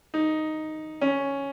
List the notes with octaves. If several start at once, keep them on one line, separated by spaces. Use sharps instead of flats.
D#4
C#4